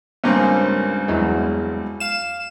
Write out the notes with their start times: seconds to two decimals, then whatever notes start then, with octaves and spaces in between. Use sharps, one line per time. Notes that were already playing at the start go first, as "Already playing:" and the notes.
0.24 C#2 G2 A#3 C4 C#4
1.08 E2 F#3 G#3
2.00 F5 E7